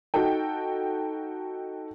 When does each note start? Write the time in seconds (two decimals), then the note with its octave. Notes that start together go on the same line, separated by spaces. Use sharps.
0.14 D#4 F#4 A4 G5